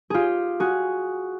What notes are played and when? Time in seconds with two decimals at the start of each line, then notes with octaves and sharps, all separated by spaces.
0.10 F4 G4 G#4
0.60 F#4 G#4